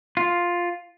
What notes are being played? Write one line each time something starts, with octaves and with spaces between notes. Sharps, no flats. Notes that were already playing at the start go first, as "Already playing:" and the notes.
F4